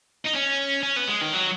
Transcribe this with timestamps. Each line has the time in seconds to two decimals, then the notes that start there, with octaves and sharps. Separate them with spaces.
0.25 D#4
0.35 C#4
0.83 C#4
0.97 B3
1.08 G#3
1.21 D#3
1.33 F#3